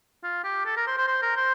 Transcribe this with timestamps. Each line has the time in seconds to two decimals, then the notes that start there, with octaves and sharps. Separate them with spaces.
0.23 F4
0.44 G4
0.65 A4
0.77 A#4
0.87 C5
0.98 C5
1.08 C5
1.22 A#4
1.37 C5